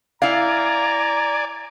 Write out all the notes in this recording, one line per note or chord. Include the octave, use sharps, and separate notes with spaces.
E4 D5 F5 G#5 A#5